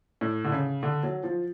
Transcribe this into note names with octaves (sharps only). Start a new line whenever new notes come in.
A2
D3
C#3
D3
F#3
F3